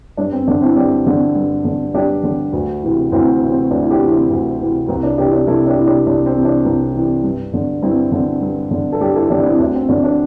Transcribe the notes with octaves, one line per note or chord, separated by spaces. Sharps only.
G2 D4
C4
D3 D4
C4 E4
G2 D4 G4
D3
G2
D3
G2 D4 G4
D3
D2
C3 E3
D2 C4 E4
C3 E3
C4
D2 D4
E4
D4 G4
C3 E3
C4 E4
D2
C3 E3
C2 C4
D4
C3 E3 D4 G4
D4 G4
C2 E4 A4
D4 G4
C3 E3
D4 G4
C2 D4
C4
C3 E3
D4
C2
C3 E3
G2
D3
G2 C4 E4
D3
G2
D3
A4
G2 D4 G4
E4 A4
D3 D4 G4
D4
C4 E4
D2 D4
C4
D3 D4
D4